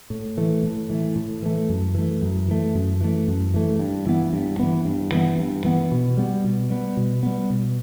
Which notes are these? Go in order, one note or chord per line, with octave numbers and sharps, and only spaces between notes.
A2
E3 A3
A2
E3 A3
A2
E3 A3
F#2
E3 A3
F#2
E3 A3
F#2
E3 A3
F#2
E3 A3
G2
E3 B3
G2
E3 B3
G2
E3 B3
G2
E3 B3
B2
G3 B3
B2
G3 B3
B2
G3 B3
B2